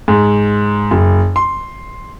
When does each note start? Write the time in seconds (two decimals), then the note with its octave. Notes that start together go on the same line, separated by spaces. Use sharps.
0.08 G#2
0.91 F#1
1.36 C6